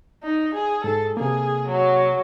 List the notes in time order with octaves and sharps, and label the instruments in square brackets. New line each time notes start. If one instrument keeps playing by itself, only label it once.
[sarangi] D#4
G#4
[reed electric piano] G#2 G#4 [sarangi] A4
[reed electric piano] C3 A#3 [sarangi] G#4
[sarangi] F#3